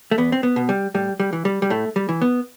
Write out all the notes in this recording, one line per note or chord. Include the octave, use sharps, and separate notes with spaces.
A3
E2 B3
C4
B3
B2
G3
A2 G3
G3
E3
G3
G3
A2 A3
G3
E3
B3